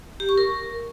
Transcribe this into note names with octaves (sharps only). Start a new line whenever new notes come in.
G4
C#6
A#4